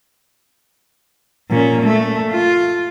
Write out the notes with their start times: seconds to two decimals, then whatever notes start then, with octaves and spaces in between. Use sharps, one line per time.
1.50 A#2 C#4
1.82 A3
2.31 F4